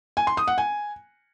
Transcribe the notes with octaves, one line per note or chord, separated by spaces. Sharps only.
G#5
C6
D#6
F#5
G#5